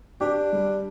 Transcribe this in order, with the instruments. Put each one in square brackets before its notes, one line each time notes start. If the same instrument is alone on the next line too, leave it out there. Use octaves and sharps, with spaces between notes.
[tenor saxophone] D4 [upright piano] G4
[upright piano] G3